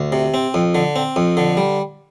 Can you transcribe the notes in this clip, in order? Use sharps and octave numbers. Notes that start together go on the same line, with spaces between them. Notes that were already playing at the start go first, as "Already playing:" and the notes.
Already playing: D2
C3
C4
F2
D3
C4
F2
D3
G3